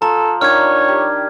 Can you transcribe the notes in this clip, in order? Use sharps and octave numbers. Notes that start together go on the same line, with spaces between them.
F3 A4 A#5
D#3 F3 D4 C#5 F6 G#6
G4